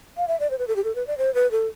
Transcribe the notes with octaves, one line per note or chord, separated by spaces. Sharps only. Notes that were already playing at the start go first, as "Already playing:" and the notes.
F5
E5
D5
C5
B4
A4
G4
A4
B4
D5
C5
B4
A4